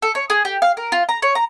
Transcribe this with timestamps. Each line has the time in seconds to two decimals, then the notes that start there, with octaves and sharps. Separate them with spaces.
0.02 A4
0.15 C#5
0.30 G#4
0.45 G4
0.62 F5
0.77 A#4
0.92 F4
1.09 A#5
1.22 C#5
1.35 A#5